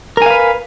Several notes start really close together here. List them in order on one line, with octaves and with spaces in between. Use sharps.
A#4 G#5 F5 B4